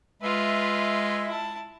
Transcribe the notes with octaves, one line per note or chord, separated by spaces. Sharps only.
G#3 F4 B4 E5
E4 A5